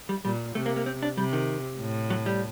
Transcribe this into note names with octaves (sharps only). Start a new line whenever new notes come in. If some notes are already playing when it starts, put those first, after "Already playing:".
G3
A#2 G3
C3 A3
A#3
A#3
C4
D4
C3 G3
D#3
A2
F#3
G3